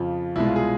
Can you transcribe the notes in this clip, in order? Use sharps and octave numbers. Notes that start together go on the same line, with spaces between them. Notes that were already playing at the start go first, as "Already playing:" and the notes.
Already playing: F2 C#3 F3 F4
C2 B2 G#3 E4
F4
G#4